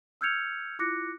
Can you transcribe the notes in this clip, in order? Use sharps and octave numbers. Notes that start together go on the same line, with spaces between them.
E6 F6 G6 G#6 C#7 F7
E4 F4 D6 F#6 A#6 C#7